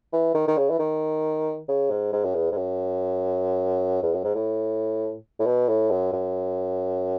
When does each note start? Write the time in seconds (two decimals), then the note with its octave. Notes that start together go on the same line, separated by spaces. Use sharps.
0.13 E3
0.34 D#3
0.48 D#3
0.57 C#3
0.70 E3
0.79 D#3
1.68 C#3
1.90 G#2
2.13 G#2
2.24 F#2
2.35 E2
2.52 G#2
2.57 F#2
4.03 E2
4.14 F#2
4.24 G#2
4.35 A2
5.39 A2
5.46 B2
5.68 A2
5.91 F#2
6.13 F#2